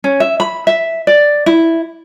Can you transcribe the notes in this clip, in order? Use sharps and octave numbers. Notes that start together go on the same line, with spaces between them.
C#4
E5
B5
E5
D5
E4